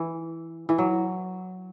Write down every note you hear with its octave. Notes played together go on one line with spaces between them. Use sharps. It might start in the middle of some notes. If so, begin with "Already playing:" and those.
Already playing: E3
E3
F#3